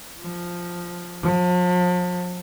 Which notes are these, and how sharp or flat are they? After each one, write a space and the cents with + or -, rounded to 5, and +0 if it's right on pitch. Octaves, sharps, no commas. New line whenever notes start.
F3 +5
F3 +40